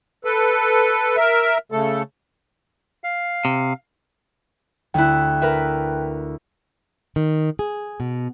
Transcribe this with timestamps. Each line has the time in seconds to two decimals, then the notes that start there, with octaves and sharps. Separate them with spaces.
0.25 A4 B4
1.17 A#4 E5
1.72 C#3 A3 A4
3.04 F5
3.45 C3
4.94 D2 E4 G5 F#6
5.41 A#4 B4 E5
7.16 D#3
7.59 G#4
8.00 B2